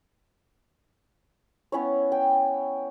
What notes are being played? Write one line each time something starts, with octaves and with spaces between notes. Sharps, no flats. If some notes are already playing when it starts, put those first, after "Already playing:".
B3 C#4 E4 C#5
G5